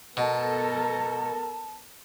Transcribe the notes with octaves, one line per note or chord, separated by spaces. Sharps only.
B2 B3 A4 A#4 A5